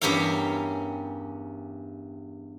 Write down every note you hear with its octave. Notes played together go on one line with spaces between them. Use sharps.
E2 G2 C#4 G4 A#4 F5